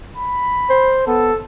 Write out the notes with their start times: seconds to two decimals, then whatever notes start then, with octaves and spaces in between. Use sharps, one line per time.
0.17 B5
0.70 C5
1.07 B3 A4